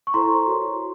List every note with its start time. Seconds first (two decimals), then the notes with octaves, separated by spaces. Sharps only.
0.07 C#6
0.14 E4 A4 C5 A#5 C6
0.47 F#4 A#4 C#5